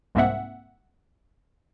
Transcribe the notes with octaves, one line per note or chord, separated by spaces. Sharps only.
C2 G#2 A#3 C4 E5 F#5